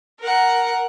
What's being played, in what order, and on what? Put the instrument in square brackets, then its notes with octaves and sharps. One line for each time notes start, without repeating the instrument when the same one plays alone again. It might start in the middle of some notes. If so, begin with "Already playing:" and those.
[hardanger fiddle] A#4 F#5